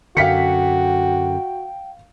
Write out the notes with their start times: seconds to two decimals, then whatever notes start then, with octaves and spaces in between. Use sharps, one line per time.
0.17 F#2 D3 F#4 F5 G5 B6 C#7